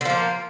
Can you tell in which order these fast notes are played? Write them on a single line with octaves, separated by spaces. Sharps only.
D3 F3 A#3